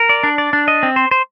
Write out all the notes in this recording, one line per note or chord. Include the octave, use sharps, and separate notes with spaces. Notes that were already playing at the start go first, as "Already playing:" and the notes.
Already playing: A#4
D5
D4
D5
D4
D#5
C4
C5
C5